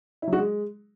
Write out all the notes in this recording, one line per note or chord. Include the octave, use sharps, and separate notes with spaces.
E4
F#3
F#4
G#3